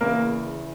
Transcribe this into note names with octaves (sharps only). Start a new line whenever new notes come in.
E2 C#3 E3 A#3 A#4